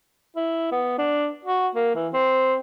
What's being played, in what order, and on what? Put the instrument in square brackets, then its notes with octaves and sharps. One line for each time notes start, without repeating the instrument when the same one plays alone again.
[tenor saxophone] E4
B3
D4
F#4
A#3
E3
C4